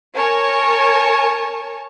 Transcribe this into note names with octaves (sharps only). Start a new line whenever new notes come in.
A#4 C#5 G#5 A5